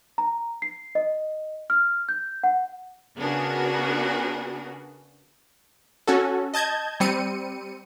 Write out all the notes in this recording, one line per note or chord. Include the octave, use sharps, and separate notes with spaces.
A#5
C7
D#5
F6
G6
F#5
C#3 B3 D4 F#4 G#4 A#4
C#4 F#4 A4
D#5 A5 G6 G#6
G3 C4 C#7 D#7